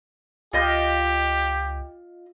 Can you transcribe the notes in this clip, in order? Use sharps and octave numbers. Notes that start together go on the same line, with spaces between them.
C#2 F4 G4 D#5 G6